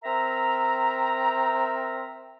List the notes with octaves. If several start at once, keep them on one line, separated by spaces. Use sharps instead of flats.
C4 A#4 E5 A#5